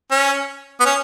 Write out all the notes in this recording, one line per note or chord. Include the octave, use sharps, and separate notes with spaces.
C#4
B3
C#4